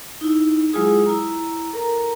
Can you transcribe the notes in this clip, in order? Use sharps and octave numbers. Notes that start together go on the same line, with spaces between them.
D#4 E4
F#3 G#3 E4 F4 G#4 D#6
E4 A#5
A4 A#4 A#5